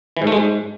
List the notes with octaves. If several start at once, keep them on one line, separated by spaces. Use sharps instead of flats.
E3
G#2
A3
G#3
G#2